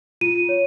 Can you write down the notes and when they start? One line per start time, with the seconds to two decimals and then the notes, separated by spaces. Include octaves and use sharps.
0.21 F4 D#7
0.49 C#5